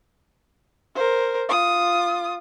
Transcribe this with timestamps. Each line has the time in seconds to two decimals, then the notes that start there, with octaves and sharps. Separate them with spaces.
0.95 A#4 C5
1.49 F4 D#6